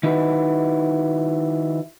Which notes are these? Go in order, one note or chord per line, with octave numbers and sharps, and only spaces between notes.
D#3 D#4 E4 F#4 G#4 B4